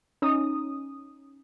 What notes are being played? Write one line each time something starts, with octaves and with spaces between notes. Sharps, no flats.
C#4 D#4 D#6